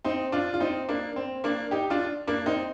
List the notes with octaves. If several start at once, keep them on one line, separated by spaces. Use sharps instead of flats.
C4 D#4
D4 F4
F4
C4 D#4
A#3 D4
C4
A#3 D4
D#4 G4
D4 F4
A#3 D4
C4 D#4